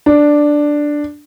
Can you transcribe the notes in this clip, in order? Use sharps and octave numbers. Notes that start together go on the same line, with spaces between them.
D4